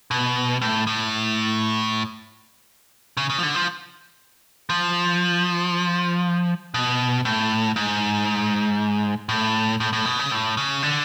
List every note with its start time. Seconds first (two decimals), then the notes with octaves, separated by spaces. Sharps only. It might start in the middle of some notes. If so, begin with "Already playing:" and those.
0.11 B2
0.62 A2
0.87 A2
3.17 C#3
3.30 C#3
3.38 F3
3.43 D3
3.55 F3
4.70 F3
6.74 B2
7.25 A2
7.76 G#2
9.29 A2
9.80 A2
9.93 A2
10.06 B2
10.19 C#3
10.31 A2
10.57 C#3
10.83 D3